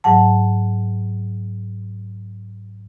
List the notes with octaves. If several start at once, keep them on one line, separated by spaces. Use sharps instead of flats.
G#2 F#3 F#5 A5